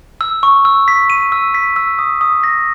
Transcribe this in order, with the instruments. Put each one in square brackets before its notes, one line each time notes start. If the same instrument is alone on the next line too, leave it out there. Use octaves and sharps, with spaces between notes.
[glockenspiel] E6
C#6
E6
B6
D#7
E6
B6
E6
D#6
D#6
A#6